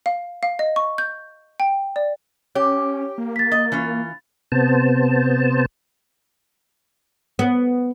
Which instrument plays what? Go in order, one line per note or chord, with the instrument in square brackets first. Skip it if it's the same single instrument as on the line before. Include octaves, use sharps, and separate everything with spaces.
[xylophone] F5
F5
D#5
C#6
G6
G5
D5
[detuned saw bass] C#4 [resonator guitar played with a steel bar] G4 [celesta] C#5
[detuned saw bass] A#3
[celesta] A6 B6
[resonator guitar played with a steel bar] D#5 [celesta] A6
[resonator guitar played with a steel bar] E3 C#4 F4
[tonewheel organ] C3 B3 C5 A5
[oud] B3